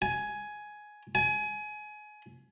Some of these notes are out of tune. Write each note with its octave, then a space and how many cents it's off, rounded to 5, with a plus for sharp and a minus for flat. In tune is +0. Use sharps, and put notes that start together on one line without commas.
G#5 +10
G#5 +25